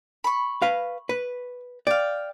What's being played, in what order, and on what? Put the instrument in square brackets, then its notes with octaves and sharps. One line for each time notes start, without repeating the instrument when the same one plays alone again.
[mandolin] B5 C#6
[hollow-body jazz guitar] B4 F5
B4
[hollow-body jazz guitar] D5 [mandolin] F5 G5